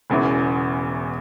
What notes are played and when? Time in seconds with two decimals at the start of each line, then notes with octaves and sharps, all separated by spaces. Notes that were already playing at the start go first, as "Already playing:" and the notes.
0.10 E1 E2 C#3 E3